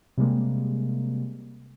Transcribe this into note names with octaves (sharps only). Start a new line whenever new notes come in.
C3 G3 G#3 A#3